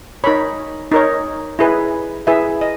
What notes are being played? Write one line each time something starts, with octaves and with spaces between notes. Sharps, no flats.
D#4 A#4 C#5 B5
D#4 A#4 C#5
E4 G#4 B4
E4 G#4 B4 E5
D#5